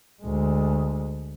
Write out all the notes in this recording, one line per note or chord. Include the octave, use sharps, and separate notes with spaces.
D2 G#3